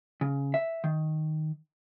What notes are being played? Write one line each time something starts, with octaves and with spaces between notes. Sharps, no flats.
C#3
E5
D#3